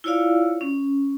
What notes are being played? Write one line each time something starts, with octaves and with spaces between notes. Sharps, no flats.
E4 F4 C#5 D5 F5
C#4